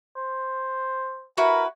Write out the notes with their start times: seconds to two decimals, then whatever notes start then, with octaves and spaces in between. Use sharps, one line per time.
0.16 C5
1.37 E4 F#4 A#4 B4